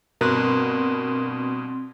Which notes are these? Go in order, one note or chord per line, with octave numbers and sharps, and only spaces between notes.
G2 B2 C4 A#4 C6 F#6